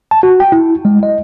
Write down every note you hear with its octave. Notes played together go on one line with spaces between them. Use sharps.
A5
F#4
G5
E4
G#3
D#5